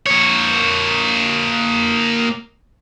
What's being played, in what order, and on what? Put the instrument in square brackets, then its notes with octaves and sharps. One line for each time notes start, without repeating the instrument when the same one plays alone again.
[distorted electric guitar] A#3 C#5